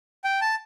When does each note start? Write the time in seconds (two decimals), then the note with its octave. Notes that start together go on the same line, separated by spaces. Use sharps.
0.24 G5
0.41 A5